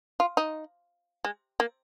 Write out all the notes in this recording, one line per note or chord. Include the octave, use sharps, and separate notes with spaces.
F4
D#4
G#3
A#3